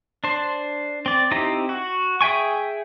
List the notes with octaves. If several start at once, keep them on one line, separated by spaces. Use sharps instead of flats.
D4 C5
C4 D5
C4 D#4 E4 G4 A#5
F#4
G#4 E5 G5 G#5 C#6